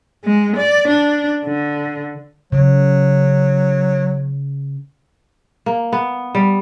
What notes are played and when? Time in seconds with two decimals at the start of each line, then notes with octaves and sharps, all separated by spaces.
0.24 G#3
0.56 D5
0.88 D4
1.45 D3
2.52 C#3 F#3
5.66 A#3
5.92 B3
6.35 G3